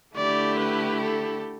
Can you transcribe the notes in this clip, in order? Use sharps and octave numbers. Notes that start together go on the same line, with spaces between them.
D3 A3 E4 G4 D5
B4
A4